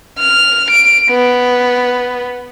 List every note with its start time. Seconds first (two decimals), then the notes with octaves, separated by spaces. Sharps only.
0.19 F6
0.71 D7
1.10 B3